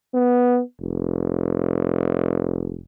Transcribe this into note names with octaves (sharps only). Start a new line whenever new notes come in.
B3
F1